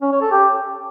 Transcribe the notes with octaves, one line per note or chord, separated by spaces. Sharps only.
C#4
C#5
A4
G4